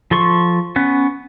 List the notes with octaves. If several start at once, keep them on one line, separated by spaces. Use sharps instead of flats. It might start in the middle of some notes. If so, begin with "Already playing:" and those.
F3 A4 C6 C#6
B3 C#4 F#6